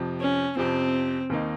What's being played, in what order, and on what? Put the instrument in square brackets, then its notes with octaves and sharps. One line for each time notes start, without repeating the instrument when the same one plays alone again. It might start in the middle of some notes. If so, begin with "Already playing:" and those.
Already playing: [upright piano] F2 C3 F3
[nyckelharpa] C#4
[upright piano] F2 C3 F3 [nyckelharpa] C4
[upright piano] D#2 D#3 A#3 D#4